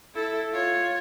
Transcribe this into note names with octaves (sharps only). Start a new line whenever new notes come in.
E4 A4
F4 C#5